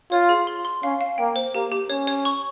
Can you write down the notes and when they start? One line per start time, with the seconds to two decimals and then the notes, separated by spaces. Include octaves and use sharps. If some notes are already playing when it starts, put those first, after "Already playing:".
0.11 F4 C#5
0.29 G#4
0.47 C6
0.65 C6
0.83 C#4 F5
1.01 F5
1.18 A#3 G5
1.36 C5
1.54 A#3 G4
1.72 G4
1.90 C#4 C#5
2.07 C#5
2.25 C#6